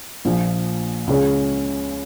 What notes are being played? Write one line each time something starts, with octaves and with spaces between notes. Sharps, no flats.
A#1 A#2 F3
C#2 C#3 G#3 C#4